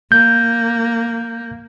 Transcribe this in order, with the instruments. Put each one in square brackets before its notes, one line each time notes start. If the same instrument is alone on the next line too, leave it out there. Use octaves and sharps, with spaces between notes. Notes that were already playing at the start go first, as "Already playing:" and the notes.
[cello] A#3 [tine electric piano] G6